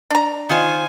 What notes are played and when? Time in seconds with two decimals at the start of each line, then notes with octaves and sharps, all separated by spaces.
0.10 D4 A#5
0.49 D#3 F4 C5 G#5